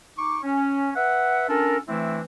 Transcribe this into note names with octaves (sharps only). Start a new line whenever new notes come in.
D#4 C#6 D6
C#4
B4 E5 F#5
C#4 D4 F4 A4 A#4
E3 A3 C4 D4 E4